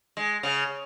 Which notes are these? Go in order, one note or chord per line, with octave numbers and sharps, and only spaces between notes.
G#3
C#3